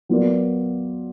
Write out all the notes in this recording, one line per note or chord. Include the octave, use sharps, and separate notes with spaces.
F#3 B3 F4 A#4 D5